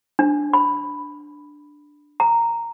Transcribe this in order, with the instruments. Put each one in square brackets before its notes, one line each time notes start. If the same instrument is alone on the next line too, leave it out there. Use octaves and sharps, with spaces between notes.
[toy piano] D4
B5
A#5